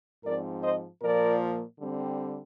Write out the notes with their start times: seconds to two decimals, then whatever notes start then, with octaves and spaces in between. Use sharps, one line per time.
0.25 G#2 F3 C4 A#4 D5
0.63 C5 D#5
1.02 A#2 F3 A#3 A#4 D5
1.79 D3 G3 C4